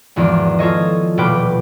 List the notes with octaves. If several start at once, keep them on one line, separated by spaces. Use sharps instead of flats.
G#1 E2 F3 D5
F4 A4 C#5 D#5
D#1 B2 F4 B4 G5 D6